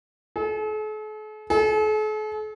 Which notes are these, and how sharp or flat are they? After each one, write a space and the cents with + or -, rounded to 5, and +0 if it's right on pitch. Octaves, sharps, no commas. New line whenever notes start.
A4 -45
A4 -45